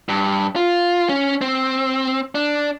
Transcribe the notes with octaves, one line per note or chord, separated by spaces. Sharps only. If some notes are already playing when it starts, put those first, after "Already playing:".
G2
F4
C#4
C4
D4